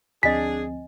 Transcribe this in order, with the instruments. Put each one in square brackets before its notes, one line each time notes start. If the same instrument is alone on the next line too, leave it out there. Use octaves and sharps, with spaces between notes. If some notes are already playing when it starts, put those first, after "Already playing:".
[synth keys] D2 F3 C4 [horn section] D4 G#4 [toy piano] D#5 G#5 [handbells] B6